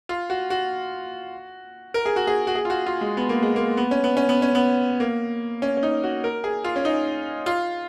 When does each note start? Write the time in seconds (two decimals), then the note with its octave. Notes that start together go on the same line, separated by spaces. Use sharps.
0.09 F4
0.30 F#4
0.50 F#4
1.94 A#4
2.06 G#4
2.16 F#4
2.27 G#4
2.47 F#4
2.55 G#4
2.65 F4
2.70 F#4
2.86 F4
3.01 G#3
3.17 B3
3.29 A#3
3.42 G#3
3.56 A#3
3.77 B3
3.91 C#4
4.04 B3
4.17 C#4
4.29 B3
4.42 C#4
4.55 B3
5.00 A#3
5.62 C#4
5.77 C#4
5.83 D#4
6.03 F#4
6.24 A#4
6.44 G#4
6.64 F4
6.76 C#4
6.85 D#4
7.46 F4